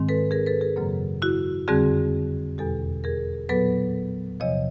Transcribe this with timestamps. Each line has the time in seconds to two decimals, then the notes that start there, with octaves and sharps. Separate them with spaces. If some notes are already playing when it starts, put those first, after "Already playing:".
Already playing: G#2 D#3 G#3 C4
0.09 A4 B4
0.31 G#4 A#4
0.46 A4 B4
0.61 G#4 A#4
0.76 F#2 C#3 F#3 A#3
1.22 E4 F#4
1.68 F2 D3 G3 C4 F#4 G#4
2.58 E2 B2 G3 G4 A4
3.04 G#4 A#4
3.49 A#2 F#3 B3 A4 B4
4.40 E2 C3 F3 C#5 D#5